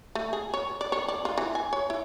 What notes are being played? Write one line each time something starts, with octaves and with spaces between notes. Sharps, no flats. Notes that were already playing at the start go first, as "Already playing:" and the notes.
A3
G#4
C#5
D5
C#5
D5
F4
E3
G#5
C#5
E4